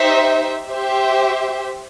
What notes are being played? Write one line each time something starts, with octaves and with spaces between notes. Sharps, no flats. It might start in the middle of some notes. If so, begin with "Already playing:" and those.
Already playing: D#4 G4 C5 E5
G4 C5 E5